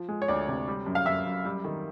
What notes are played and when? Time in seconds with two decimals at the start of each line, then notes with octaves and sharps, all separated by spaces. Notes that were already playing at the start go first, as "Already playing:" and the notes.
Already playing: F3
0.09 G#3
0.22 C#5
0.28 D2 D5
0.48 C3
0.68 G3
0.86 F#2
0.95 F5
1.06 F#2 E5
1.26 F#2
1.45 G3
1.65 D#3